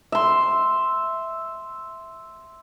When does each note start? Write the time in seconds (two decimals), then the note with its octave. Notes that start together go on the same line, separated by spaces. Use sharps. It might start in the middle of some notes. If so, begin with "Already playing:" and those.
0.12 E5 C6